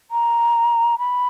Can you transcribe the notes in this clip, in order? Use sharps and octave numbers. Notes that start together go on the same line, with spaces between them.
A#5
B5